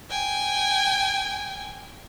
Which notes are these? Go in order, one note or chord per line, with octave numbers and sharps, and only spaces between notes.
G5 G#5